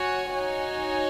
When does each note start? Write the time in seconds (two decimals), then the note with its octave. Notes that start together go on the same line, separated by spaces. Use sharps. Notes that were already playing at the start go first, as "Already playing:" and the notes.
Already playing: F#4 C#5 G#5
0.31 D#4 F#4 C#5 G#5